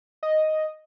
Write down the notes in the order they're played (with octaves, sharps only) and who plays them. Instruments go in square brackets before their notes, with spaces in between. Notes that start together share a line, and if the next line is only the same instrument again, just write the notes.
[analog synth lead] D#5